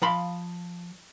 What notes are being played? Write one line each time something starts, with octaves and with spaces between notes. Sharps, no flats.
F3 F5 B5 C6